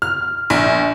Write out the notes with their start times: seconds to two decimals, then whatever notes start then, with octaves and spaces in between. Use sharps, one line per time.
0.02 F6
0.50 A#1